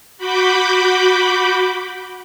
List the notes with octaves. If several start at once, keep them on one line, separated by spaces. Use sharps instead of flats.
F#4 B5 D6 G6